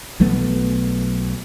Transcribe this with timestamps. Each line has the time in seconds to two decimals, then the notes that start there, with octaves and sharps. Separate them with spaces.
0.20 B1 F#3 A3 B3